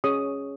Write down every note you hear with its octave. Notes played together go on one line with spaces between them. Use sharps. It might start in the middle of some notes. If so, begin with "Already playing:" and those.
C#4 G#4 C#5 D#6